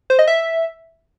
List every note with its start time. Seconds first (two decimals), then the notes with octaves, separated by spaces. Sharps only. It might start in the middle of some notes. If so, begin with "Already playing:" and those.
0.10 C5
0.19 D#5
0.27 E5